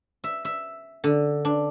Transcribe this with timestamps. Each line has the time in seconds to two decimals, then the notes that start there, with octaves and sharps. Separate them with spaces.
0.24 E5
0.45 E5
1.04 D3
1.45 D4